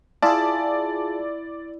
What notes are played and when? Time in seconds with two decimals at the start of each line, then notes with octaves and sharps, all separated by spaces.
0.22 E4 F4 G#4 D5 A5